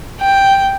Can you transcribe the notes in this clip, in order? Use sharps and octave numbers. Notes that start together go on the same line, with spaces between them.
G5